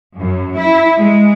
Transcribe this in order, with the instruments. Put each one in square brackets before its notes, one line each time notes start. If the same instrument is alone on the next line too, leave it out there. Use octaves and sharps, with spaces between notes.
[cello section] F#2
E4
G#3